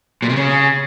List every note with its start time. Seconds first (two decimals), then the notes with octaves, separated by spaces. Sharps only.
0.22 A#2
0.29 C3
0.36 C#3